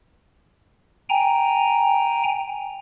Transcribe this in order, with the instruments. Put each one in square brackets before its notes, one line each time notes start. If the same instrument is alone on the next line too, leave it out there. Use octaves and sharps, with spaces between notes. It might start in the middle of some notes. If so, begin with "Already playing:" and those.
[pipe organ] G5 G#5 A#5